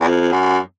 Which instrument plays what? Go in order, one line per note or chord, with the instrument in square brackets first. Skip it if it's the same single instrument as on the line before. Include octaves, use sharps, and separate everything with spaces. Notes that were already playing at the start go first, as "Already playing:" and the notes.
[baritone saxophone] E2
F2
F#2